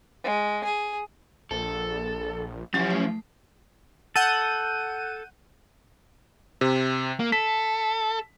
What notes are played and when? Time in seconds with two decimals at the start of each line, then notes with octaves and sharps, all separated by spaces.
0.24 G#3
0.64 G#4
1.51 A#1 A4
2.74 F3 F#3 C#4 E4 G4
2.91 A3
4.16 A4 F#5 G6 D#7
6.61 C3
7.20 A#3
7.32 A4 B6